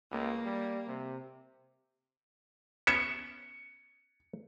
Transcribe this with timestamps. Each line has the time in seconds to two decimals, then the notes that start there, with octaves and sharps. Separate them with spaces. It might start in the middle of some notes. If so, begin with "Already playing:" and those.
0.11 C#2 A#3
0.45 G3
0.87 C3
2.87 B3 C#4 E5 C#7